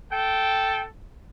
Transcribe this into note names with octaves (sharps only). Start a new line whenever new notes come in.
A4 G5